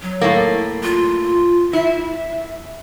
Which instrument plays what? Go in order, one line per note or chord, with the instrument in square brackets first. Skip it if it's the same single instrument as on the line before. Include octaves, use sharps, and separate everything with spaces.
[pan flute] F#3
[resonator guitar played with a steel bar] A2 A3 A#3
[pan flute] F4
[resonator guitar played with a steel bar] E4 [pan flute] E5